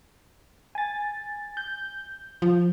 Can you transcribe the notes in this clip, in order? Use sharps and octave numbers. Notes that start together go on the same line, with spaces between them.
G#5 A6
G6
F3